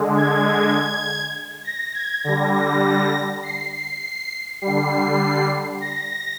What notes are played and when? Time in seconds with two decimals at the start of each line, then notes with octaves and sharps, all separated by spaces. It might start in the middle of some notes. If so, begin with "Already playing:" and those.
Already playing: D3 G#3
0.16 G#6
1.64 A#6
1.94 G#6
2.24 D3 G3 A#6
2.53 A#6
3.43 C7
3.73 C7
4.62 D3 G3 C7
5.81 A#6